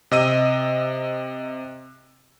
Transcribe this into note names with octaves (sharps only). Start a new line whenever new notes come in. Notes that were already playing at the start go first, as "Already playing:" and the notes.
C3 D#5 E6 D#7